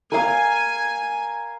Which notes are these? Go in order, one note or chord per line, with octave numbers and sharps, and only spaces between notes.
A#4 F5 G#5